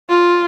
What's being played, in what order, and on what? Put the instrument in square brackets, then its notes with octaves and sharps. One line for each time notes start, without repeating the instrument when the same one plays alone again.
[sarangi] F4